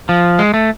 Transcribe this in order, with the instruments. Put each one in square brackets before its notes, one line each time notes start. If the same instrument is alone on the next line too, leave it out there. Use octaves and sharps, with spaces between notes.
[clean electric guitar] F3
G#3
A3